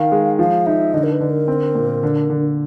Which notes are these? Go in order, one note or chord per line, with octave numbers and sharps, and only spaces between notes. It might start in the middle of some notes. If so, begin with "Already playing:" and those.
Already playing: D#3 F5
G#3
F3 F5
D#4 E5
D3 D#5
A#4
B4
D3
A#4
C4
A#2
D3
D3